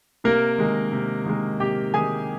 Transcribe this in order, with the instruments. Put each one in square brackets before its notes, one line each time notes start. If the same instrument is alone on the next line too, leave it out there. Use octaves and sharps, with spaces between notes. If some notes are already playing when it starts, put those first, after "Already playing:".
[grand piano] C3 A#3 A#4
D#3 G#3
C3
D#3 G#3
C3 G4 G5
D#3 G#3 G#4 G#5